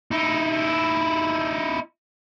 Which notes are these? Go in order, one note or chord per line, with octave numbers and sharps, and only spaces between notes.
D#4 E4